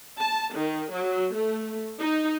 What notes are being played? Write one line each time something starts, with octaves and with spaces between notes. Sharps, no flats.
A5
D#3
F#3
A3
D#4